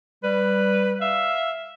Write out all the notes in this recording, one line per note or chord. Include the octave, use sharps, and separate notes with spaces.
G3 B4
E5 F5